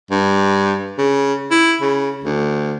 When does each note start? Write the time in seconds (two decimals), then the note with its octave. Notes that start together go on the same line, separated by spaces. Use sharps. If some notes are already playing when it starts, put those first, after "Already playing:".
0.11 G2
0.98 C#3
1.51 E4
1.82 C#3
2.24 D2